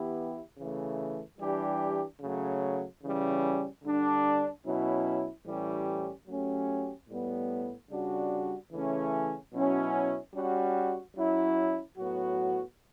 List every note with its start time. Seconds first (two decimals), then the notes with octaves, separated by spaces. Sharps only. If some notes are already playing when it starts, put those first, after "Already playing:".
Already playing: E3 B3 E4 G4
0.58 C#3 E3 A3
1.39 E3 G3 D4 G4
2.20 C#3 F#3 A3
3.03 C#3 E3 G3 C#4
3.83 D3 G3 D4
4.65 B2 F#3 C#4 E4
5.46 A2 E3 G3 C#4 G4
6.27 F#3 A3 C#4 G4
7.09 A2 G3 B3
7.90 C#3 G3 D4 F#4
8.72 C#3 E3 A3 C#4
9.53 B2 F#3 C#4 E4
10.34 G3 C#4 F#4
11.16 F#3 C#4 E4
11.97 A2 F#3 B3 F#4